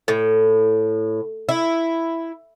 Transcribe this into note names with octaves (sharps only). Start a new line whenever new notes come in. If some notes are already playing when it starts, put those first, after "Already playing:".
A2
E4